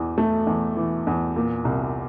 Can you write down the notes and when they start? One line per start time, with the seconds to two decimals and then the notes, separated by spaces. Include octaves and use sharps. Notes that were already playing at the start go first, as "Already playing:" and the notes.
Already playing: E2 E3
0.18 A3
0.47 E2
0.77 E3
1.07 E2
1.36 A#2
1.65 C2